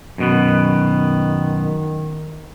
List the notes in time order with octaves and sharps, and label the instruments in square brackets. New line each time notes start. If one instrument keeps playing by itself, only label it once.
[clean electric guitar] F#2 B2 B3 [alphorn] D#3